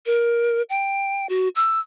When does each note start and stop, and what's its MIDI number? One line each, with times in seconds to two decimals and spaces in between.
0.06 0.62 70
0.70 1.27 79
1.29 1.49 66
1.56 1.80 88